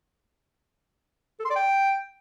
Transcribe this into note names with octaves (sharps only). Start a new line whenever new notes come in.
A4
C6
D5
G5